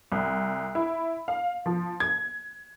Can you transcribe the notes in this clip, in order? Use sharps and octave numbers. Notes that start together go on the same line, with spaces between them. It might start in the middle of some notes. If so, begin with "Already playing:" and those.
C2
E4
F5
F3
G#6